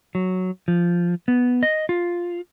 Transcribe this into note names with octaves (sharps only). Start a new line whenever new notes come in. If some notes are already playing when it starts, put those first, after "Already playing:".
F#3
F3
B3
D#5
F4